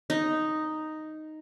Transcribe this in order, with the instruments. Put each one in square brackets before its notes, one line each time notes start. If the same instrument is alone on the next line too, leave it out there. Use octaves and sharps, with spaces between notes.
[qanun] D#4